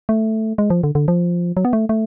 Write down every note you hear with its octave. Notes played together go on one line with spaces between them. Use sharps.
A3
G#3
F3
D3
D3
F3
F#3
B3
A3
A3